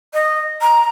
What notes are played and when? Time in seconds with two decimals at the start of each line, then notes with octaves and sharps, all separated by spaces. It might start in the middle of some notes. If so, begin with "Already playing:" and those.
0.13 D#5
0.61 A#5